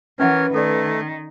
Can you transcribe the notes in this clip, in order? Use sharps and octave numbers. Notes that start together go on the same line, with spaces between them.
E3 C#4 A#4 B4 C#5 E5 F#5
D#3 A3 A4 D5